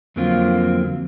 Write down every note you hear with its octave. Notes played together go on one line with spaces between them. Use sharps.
F2 D3 F#3 A#3 C4 F4